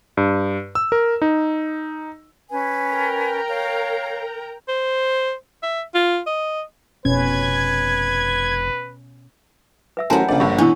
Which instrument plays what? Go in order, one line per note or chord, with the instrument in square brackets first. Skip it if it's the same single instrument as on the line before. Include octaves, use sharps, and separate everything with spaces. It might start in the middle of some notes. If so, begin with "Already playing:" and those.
[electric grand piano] G2
E6
A#4
D#4
[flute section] C#4 B4 G#5
[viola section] A#4 G5 A#5
[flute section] C#5 F5
[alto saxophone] C5
E5
F4
D#5
[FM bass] F1 [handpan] B2 C#4 [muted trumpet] B4 [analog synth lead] G#6
[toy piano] B4 E5 E6
[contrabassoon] A1 [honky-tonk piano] F#3 A#4 [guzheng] B3 C5 [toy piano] G#5 A5
[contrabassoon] A#1 [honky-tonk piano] C#3 D5
[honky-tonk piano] G1 G2 [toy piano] C#6 E6
[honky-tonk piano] B2 E3 [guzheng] C#4 [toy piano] D4 E4 E6